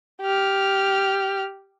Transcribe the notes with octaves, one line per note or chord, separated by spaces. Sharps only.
G4 F6